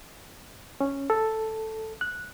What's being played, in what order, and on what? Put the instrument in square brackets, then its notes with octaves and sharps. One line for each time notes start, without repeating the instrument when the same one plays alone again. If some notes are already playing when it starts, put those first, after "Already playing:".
[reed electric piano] C#4
A4
F#6